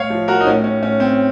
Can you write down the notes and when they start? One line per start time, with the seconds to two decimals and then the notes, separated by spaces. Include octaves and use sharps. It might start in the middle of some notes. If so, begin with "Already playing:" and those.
Already playing: A2 C#5 F5
0.10 F3
0.28 F#4 A#4
0.41 D#4
0.47 A2 C#4
0.64 C#4
0.82 A2 C#4
1.00 C4